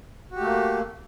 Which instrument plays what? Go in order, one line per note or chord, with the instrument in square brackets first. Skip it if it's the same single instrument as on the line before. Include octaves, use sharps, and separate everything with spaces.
[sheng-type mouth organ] F#4
G4
A3
A#3